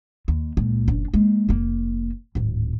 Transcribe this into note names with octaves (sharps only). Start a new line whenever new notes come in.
D#2
C#2 A#2
F#1 D4
G#3 A#3
F1 A#3
D1 G#1